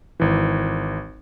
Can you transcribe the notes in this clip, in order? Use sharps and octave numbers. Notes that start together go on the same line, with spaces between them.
G#1 E3